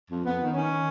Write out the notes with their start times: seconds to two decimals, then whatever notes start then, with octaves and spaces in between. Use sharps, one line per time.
0.09 F2
0.24 F2 B3
0.39 D#3
0.54 D#3 C#4
0.69 D#3